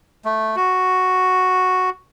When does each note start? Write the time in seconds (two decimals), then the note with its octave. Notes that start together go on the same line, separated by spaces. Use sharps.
0.25 A3
0.56 F#4